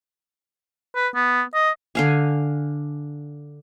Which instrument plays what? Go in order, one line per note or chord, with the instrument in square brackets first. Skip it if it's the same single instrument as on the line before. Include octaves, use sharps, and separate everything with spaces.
[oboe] B4
B3
D#5
[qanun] D3 F5 G#5